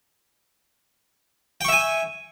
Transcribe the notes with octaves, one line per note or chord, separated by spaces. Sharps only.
E5 G5 G#5 C#6